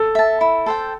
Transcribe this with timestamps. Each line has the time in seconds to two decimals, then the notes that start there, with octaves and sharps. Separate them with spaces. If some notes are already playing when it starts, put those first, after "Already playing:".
Already playing: A4
0.15 E5 A5
0.41 E4
0.66 A4 C5 G5